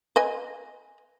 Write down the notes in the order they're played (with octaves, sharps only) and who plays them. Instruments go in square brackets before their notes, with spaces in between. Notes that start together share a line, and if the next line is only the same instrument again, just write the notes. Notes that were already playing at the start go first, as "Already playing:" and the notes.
[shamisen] B4 D#5 G#5